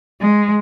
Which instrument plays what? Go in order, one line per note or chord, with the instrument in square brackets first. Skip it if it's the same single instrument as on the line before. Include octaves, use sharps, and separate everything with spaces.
[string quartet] G#3